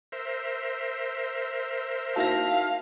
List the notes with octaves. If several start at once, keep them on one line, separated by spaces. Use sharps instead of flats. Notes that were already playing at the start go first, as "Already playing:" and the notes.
A#4 C5 E5
A#3 D#4 E4 F#4 F5 A5 A#6